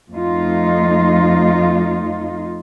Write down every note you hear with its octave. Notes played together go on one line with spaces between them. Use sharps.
F2 A3 D#4 F4